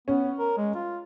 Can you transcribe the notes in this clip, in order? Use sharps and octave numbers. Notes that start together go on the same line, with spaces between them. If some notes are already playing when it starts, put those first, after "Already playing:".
B3 C#4
A#4
G#3
F4